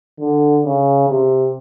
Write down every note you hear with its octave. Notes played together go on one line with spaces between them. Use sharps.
D3
C#3
C3